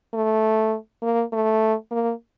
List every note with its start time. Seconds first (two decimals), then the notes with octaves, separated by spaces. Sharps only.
0.14 A3
1.02 A#3
1.33 A3
1.91 A#3